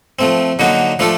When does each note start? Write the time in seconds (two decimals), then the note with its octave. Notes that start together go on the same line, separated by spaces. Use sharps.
0.19 F3 A3 C4
0.59 D3 F#3 A#3 D#4 F#4
0.99 F3 A3 D4 F4 A4